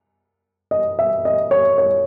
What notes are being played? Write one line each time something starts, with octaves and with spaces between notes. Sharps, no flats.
D#5
E5
D#5
C#5
C#5